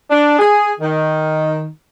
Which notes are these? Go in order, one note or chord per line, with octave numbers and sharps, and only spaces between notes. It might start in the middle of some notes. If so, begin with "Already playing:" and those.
D4
G#4
D#3